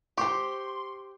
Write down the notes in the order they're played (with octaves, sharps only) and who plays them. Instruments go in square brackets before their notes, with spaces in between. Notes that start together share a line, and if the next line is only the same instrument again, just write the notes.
[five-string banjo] G4 C5 [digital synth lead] C6 [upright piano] C#6